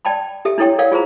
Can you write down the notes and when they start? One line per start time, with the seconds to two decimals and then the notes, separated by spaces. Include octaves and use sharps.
0.05 D5 G5 A5 B5
0.45 G4 A4 E5
0.58 D4 E4 A4 C#5 G5 C6
0.79 A4 A#4 C#5 D5 F5 F#5
0.92 F4 G#4 C5 A#5 B5